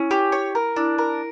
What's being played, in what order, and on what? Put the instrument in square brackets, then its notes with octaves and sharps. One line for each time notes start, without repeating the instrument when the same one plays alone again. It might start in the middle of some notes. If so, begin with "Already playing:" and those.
Already playing: [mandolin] C#4 [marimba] E4
[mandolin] G4
C#5
A#4
[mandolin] D4 [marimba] E4
[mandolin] A#4